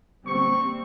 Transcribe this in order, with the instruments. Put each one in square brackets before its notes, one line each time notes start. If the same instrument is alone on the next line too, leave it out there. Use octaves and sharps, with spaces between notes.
[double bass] D3 A#3 [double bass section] G3 C4 [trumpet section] C#6